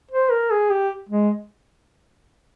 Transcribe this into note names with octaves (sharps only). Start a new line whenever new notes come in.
C5
A#4
G#4
G4
G#3